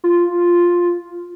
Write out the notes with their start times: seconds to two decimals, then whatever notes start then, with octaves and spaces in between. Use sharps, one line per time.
0.04 F4